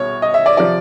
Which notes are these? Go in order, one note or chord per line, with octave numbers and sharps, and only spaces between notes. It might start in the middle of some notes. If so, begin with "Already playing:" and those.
Already playing: C2 B2 C#5
D#5
E5
D5
C3 F3 D5